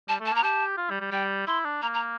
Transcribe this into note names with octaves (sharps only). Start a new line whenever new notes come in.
G3 A5
A3
A5
A#3 A#5
G4 A5
F4
G3
G3
G3 G5
E4 C6
D4
A#3 A#5
A#5